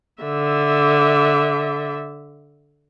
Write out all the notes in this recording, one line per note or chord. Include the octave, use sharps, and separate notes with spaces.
D3 E5